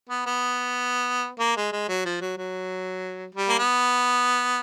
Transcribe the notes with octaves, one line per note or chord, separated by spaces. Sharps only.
B3
B3
A#3
G#3
G#3
F#3
F3
F#3
F#3
G3
A#3
B3